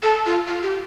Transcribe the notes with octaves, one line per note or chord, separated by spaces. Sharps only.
A4
F4
F4
G4